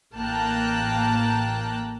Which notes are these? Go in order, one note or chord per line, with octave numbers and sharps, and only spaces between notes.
A1 A#3 G5 A5 A#5 F#6